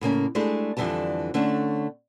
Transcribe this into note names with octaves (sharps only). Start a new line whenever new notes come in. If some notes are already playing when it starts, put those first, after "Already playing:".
A2 C#3 A#3 C#4
G#3 A3 D4 E4 G4 G#4
F2 D3 E3 G3 A5
D3 A3 C#4 D4